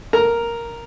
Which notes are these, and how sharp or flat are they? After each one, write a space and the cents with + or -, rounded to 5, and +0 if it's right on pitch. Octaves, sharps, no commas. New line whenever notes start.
A#4 +0 A#5 +0